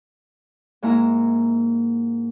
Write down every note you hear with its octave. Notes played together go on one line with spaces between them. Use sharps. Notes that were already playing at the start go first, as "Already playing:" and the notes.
G#2 A#3 E4 A#5